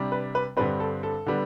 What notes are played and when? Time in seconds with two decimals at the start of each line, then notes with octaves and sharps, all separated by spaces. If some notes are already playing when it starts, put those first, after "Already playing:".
Already playing: C3 G3 D4
0.12 B4
0.35 B4
0.57 G2 D3 G3 C4 B4
0.80 A4
1.03 A4
1.26 D3 G3 B3